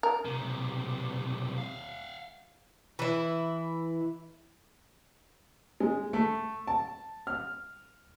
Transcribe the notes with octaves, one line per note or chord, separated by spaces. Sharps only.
A#4
B1 C3
E5 F5
E3 E4
G#3
A3
A5
F6